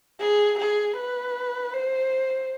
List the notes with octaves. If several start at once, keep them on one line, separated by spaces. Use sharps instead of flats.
G#4
G#4
B4
C5